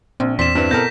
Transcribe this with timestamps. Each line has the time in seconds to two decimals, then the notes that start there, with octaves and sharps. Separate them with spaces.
0.20 A#1 C4
0.39 E2 C4 D5 C6 B6 E7
0.55 G2 C4 E4 B4
0.71 B2 A4 A#4 G6 A#6